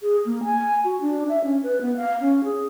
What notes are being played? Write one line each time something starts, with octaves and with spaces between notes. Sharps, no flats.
G#4
A#3
G#5
F#4
D4
E5
C#4
B4
B3
F5
C#4
G#4